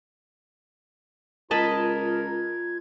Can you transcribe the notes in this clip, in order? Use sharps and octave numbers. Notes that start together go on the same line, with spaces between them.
C#2 F4 A#4 D#5 A5 B5 G#6